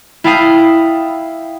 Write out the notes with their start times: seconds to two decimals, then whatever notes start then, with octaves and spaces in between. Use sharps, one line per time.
0.24 E4 F5 G5 A5 D#6 C7